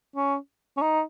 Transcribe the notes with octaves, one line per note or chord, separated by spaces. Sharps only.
C#4
C#4
D#4